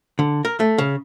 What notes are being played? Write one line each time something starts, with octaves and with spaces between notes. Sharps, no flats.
D3
A#4
A3
C#3